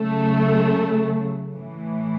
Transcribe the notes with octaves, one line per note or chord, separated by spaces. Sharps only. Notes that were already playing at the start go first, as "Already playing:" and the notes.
Already playing: C#3 F#3 A3
A2 E3